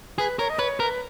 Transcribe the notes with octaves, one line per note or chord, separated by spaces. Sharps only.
G#4 B4
A#4 C#5
D#5
B4 C#5
A#4 B4